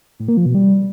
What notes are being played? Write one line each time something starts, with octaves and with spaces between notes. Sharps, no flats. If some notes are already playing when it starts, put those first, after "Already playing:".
A2
A#3
F3
B2
G3